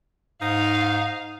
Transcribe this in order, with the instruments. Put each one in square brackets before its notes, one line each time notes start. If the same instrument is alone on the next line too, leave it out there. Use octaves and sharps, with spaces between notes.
[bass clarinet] G#2 [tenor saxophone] D#4 [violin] F5